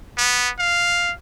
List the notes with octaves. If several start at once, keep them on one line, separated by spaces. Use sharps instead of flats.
B3
F5